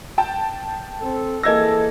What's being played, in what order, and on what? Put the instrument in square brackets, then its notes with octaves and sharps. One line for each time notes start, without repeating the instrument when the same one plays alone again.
[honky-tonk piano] G5 A5
[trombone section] C4 A4
[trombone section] E3 G#4 A4 [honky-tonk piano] A#3 G#6 A#6 [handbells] D#5 E6